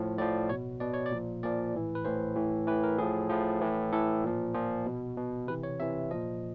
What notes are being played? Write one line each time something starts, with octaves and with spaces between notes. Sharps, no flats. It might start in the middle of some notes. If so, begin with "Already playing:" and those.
Already playing: A2 F3
A2 F3 D5
B2 C#5
B2 D5
C#5
D5
A#2 F3
A#2 F3 D5
A2 E3
B4
A2 E3 C5
A2 E3
A2 E3 B4
A#4
A2 F3 G#4
A2 F3
A2 E3
A2 E3 A4
A#2 F3
A#2 F3
B2
B2
C3 E3 B4
C#5
C3 E3 E5
A#2 F3 D#5